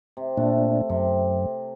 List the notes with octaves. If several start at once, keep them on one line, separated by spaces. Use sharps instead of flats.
C3
A#2 A3 D4
F#2 C3